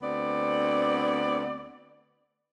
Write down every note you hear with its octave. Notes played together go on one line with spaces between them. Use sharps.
D2 B3 C4 D5